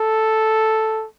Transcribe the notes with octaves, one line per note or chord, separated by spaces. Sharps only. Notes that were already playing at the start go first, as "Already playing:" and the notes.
Already playing: A4